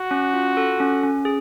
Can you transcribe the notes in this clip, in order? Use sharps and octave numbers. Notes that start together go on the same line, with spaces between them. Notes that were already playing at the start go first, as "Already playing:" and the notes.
Already playing: F#4
C#4
F4
A4
C#4
C#4
G#4